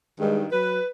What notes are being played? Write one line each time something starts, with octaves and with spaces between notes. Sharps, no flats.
G2 D#3 G#3
F#3 B4